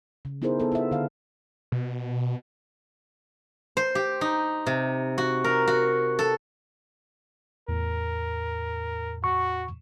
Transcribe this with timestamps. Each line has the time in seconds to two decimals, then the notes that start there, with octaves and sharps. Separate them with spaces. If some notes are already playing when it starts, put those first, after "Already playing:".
0.25 C#3
0.42 B3 D#4 E4 G#4 A#4 C5
0.60 B3 A4
0.72 E4 F4 E5
0.91 D3 F5
1.72 B2
3.77 C5
3.95 G4
4.21 D#4
4.66 C3
5.18 F#4
5.44 A#4
5.67 F#4
6.19 A4
7.68 E2 A2 A#4
9.24 F#4 C#6